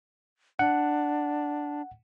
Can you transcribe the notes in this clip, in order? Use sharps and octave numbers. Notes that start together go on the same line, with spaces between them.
D4 F#5